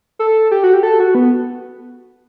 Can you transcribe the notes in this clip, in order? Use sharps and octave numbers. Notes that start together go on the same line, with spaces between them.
A4
G4
F#4
G4
A4
F#4
B3